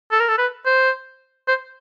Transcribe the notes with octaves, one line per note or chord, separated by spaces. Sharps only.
A4
A#4
A4
B4
C5
C5